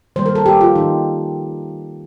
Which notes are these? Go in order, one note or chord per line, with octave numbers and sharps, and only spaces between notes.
D#3 G3 A#3 C5
A#4
A4
G4
F4
D#3 G3 A#3 D#4